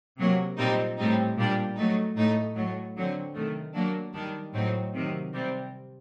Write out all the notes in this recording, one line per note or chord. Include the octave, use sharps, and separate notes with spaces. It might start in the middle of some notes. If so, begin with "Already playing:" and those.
C3 F#3 A#3
A#2 G3 C4 D#4
A2 G3 C4 D#4
A#2 G3 D4
F#3 A3 D#4
A2 A3 D#4
A2 F#3 A3
D3 F#3 C4
C3 D#3 A3
F#3 A#3 D4
D#3 G3 D4
A2 F#3 C4 D#4
C3 D#3 F#3
C3 G3 C4